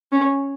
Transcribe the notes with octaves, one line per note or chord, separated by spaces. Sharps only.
C#4